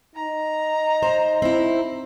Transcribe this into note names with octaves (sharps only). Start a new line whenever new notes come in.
D#4 A#5
C5
C4 E4